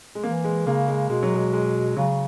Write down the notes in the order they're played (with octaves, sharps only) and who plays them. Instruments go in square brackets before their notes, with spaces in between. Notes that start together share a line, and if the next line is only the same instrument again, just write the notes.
[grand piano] G#3
[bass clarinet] E3 [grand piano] A#3
[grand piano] G#3
[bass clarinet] C#3 [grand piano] A#3
[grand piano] G#3
[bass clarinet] B2 [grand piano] G#3
[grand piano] F#3
G#3
G#3
[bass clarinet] C#3 [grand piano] F#3